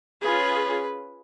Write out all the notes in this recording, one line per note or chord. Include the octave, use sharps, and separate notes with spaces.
C#4 F4 G#4 B4